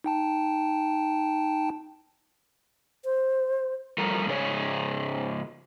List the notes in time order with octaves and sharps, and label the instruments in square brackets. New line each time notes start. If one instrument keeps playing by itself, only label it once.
[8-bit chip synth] D#4 G5 A5
[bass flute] C5
[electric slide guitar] F3 G3 A4 A#4
G#2 C#3 G#4 C#5